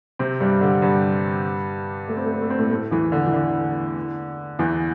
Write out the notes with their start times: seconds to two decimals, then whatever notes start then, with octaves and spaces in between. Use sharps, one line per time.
0.19 C3 C4
0.40 G2 G3
0.61 D3
0.82 G2 G3
2.08 A3
2.17 C4
2.25 A3
2.34 C4
2.42 A3
2.50 C4
2.59 A2 A3
2.70 A2 A3
2.91 E2 E3
3.12 D3
3.27 E3
3.33 D3
4.59 E2 E3